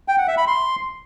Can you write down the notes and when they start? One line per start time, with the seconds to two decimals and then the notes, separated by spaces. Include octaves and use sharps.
0.08 G5
0.18 F#5
0.28 E5
0.38 B5
0.47 C6